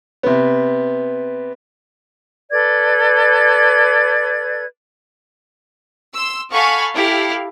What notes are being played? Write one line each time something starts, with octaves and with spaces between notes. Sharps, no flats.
C3 B3
A4 B4 D5 G#6
C6 E6
A4 F5 F#5 G#5 B5 C#6
E4 G4 A4 F5